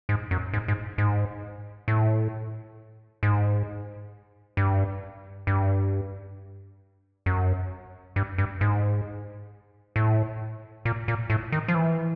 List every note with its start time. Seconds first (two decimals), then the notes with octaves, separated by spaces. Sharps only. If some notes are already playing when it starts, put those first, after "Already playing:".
0.09 G#2
0.31 F#2
0.54 G#2
0.68 G#2
0.98 G#2
1.88 A2
3.23 G#2
4.57 G2
5.47 G2
7.26 F#2
8.16 G2
8.38 G2
8.61 G#2
9.96 A2
10.85 A#2
11.08 A#2
11.30 A2
11.52 D#3
11.68 F3
11.75 E3